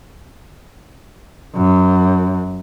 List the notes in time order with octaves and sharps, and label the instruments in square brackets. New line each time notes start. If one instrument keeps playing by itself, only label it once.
[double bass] F#2